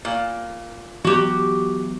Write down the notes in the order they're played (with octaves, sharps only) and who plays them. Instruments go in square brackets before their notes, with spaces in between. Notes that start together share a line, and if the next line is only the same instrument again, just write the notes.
[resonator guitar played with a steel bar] A#2
[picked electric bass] E3 F#3 B3 [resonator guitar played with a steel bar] F#4 G4